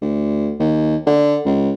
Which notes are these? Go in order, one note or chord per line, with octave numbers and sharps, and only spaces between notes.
D2
D#2
D3
C#2